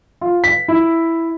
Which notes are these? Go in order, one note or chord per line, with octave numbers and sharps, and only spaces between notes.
F4
B6
E4